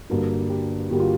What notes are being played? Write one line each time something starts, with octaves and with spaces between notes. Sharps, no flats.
G2 D3 G3 A#3 F#4
G4
G2 D3 G3 A#3 F#4
F4